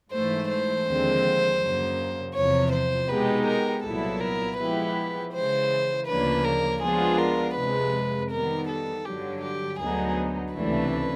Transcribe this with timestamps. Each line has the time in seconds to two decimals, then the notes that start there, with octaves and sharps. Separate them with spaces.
0.11 G#2 E3 A3 C5
0.49 C5
0.86 D#2 D3 F3 G#3 C4
1.60 F#2 C#3 F#3 A#3
2.34 E2 C3 F3 C#5
2.72 C5
3.09 B2 G#3 B3 D#4 G4 B4
3.46 A#4
3.84 C2 A#2 F#3 B3 E4 A4
4.21 A#4
4.58 F3 G#3 B3 E4 G4 B4
5.33 C#3 E3 G#3 C5
6.07 D2 C#3 F3 A#3 D4 B4
6.44 A#4
6.82 F3 G#3 B3 D4 F4 G#4
7.19 A#4
7.56 F2 C3 F3 G#3 B4
8.31 D#3 G3 B3 A#4
8.68 A4
9.05 G2 D3 F#3 G4
9.42 G4
9.79 D2 D3 F#3 B3 D#4 G#4
10.54 C#2 C3 E3 A3 D4 B4